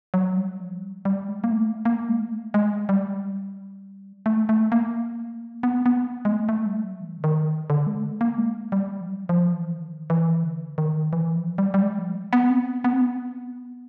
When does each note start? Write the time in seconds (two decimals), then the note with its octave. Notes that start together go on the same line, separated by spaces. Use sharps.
0.14 F#3
0.37 G3
0.60 F3
0.82 G3
1.05 G3
1.28 G#3
1.44 A#3
1.51 A3
1.85 A#3
2.09 G#3
2.19 A3
2.54 G#3
2.89 G3
4.26 A3
4.49 A3
4.72 A#3
5.63 B3
5.86 B3
6.25 G#3
6.32 A3
6.49 A3
6.66 G3
6.84 F#3
7.00 E3
7.18 D3
7.24 D#3
7.70 D3
7.87 G#3
8.00 A3
8.04 G#3
8.21 A#3
8.38 G#3
8.72 G3
9.01 F3
9.07 F#3
9.29 F3
9.53 E3
9.76 D#3
10.10 E3
10.43 D3
10.78 D#3
11.13 E3
11.36 F3
11.58 G3
11.74 G3
11.82 G#3
11.99 F3
12.33 B3
12.50 C4
12.84 B3
12.93 C4
13.02 B3